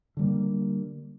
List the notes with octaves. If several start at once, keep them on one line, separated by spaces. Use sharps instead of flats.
D3 G3 A#3